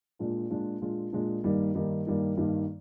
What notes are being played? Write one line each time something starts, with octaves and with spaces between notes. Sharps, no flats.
A#2 G#3 D4 F4
A#2 G#3 D4 F4
A#2 G#3 D4 F4
A#2 G#3 D4 F4
G2 D#3 G3 A#3 D#4
G2 D#3 G3 A#3 D#4
G2 D#3 G3 A#3 D#4
G2 D#3 G3 A#3 D#4